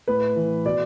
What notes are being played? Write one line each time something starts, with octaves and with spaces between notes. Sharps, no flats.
A2 B4
E3
B2 D5